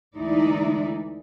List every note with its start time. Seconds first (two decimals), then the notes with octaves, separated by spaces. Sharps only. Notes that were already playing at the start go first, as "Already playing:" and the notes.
0.16 D2 E3 G#3 D#4 E4 D5